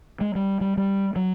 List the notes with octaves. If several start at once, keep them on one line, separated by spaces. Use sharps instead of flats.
G#3
G3
G3
G3
F#3